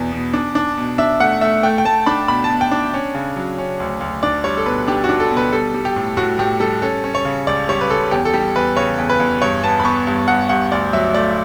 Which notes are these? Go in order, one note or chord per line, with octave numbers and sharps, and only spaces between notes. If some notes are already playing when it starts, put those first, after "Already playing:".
Already playing: E2 B2 B3
B2
D4
D4
B2
D4 E5
A3 F#5
A3 E5
A3 G5
G5
A3 A5
D4 B5
B2 B5
A5
B2
G5
D4
C#4
C#3
F#3
C#4
D2
D2
D4 D5
G3 C#5
A4
B2 B4
D4 G4
F#4
D4
A4
B2
B4
G3 A4
G3
G4
A2
A2 F#4
A2 G4
G3 A4
C#4 A4
C#4
C#5
C#3
C#2 D5
G3 C#5
B4
C#4 A4
E2 G4
A4
G3 G4
E2 B4
C#3 C#5
E2
B4
E2
G2 C#5
B3 A5
B5
B3 C#6
G2
G2 F#5
G2 F#5
D2 D5
F#3 E5
A3 D5